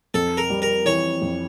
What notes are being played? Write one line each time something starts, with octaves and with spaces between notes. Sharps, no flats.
F2 A4
A#4
G3
A#4
E3 C#5
F2